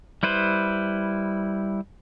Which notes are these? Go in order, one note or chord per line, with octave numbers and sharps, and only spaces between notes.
G3 E4 B4 C5